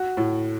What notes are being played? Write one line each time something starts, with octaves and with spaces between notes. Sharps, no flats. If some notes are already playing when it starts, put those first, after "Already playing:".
Already playing: F#4
A2